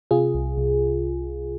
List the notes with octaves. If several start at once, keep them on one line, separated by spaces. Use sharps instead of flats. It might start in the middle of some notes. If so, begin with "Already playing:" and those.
C3 F4 G#4
C2
C2